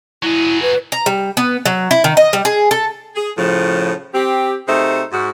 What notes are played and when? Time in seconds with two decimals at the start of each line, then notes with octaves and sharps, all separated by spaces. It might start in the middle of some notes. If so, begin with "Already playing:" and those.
0.23 F#3 E4 G#4
0.62 B4
0.92 A#5
1.06 G3
1.37 B3
1.66 F#3
1.91 E4
2.04 D#3
2.17 D#5
2.33 G3
2.45 G#4
2.71 A4
3.16 G#4
3.37 A2 C#3 F3
4.14 C4 G4
4.68 C3 A3 D#4 G#4 C5
5.12 G#2 F#4